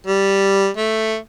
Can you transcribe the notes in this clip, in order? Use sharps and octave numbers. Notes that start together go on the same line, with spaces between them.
G3
A3